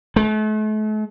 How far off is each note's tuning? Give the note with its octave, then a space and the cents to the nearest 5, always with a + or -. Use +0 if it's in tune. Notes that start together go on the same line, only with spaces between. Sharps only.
A3 -40